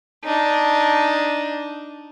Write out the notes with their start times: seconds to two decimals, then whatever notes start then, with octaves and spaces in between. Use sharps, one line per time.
0.24 D4 D#4